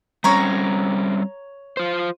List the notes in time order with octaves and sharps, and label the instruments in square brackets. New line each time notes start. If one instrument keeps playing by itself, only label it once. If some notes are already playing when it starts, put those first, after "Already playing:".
[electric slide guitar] G3 C4 C#4 [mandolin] C#5 A#5
[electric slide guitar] F4 C5